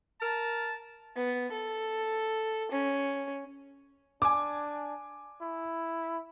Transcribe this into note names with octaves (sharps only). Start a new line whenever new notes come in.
A#4 A5
B3
A4
C#4
D4 G#5 D6
E4